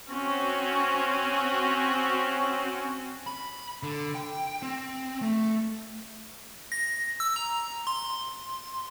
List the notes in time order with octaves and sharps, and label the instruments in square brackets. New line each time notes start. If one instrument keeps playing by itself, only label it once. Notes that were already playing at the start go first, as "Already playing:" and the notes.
[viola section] C4 C#4 F#4
[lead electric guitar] B5
D3
G5
C4
A3
[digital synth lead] A#6
E6
A#5
C6